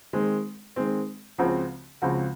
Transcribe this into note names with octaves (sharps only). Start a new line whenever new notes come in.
D#3 G#3 C4
D#3 G#3 C4
C#2 C#3 F3 C4 F#4
C#2 C#3 F3 C4 F#4